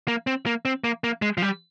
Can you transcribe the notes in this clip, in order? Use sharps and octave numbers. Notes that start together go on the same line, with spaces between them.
A#3
C4
A#3
C4
A#3
A#3
G#3
F3
G3